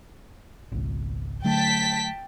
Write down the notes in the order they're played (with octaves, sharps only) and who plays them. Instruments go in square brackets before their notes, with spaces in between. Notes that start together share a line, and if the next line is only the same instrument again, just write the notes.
[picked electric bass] G#1 C#2
[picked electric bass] D3 F#3 A3 [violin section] G5 A5 B6